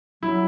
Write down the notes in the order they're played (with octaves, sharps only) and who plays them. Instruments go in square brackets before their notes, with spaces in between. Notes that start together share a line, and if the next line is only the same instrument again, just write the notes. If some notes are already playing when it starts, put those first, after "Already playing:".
[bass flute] F#3 [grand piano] E4